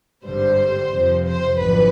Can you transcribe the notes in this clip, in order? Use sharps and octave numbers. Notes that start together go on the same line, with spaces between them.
G#1 G2 D3 G3 C5
F2 C3 F3
C5
G#1 F#2 D3 F3 B4